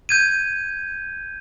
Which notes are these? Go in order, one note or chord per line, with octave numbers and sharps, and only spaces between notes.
G6 G#6 D#7